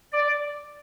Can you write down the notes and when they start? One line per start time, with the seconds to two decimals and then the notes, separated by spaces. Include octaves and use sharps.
0.13 D5